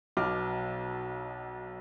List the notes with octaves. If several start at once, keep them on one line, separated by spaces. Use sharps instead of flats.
B1 B2 D6 F6